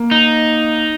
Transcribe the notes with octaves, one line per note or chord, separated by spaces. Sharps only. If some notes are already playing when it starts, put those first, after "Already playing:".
Already playing: A#3
D#4